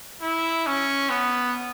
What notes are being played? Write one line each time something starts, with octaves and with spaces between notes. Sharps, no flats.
E4
C#4
B3